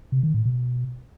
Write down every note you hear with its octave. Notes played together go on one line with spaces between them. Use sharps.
C3
D#3
A2
B2